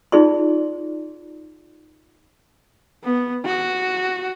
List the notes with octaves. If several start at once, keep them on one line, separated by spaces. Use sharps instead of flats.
D#4 F4 G#4 D5 C6
B3
F#4